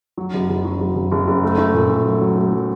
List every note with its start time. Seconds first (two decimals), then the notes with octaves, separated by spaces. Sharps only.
0.18 F#3
0.33 F#1
0.49 F#1
0.65 F#3
0.81 F#1
0.95 F#1
1.12 F#1
1.27 F#1
1.43 A3
1.58 A3
1.75 A#2
1.90 A3
2.05 F#3
2.21 F#3
2.38 A3
2.53 F#3